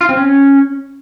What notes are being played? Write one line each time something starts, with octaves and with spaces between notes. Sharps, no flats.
F4
C4
C#4